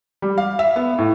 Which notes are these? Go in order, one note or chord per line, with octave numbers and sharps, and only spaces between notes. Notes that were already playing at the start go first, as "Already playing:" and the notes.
G3
F5
E5
B3
A2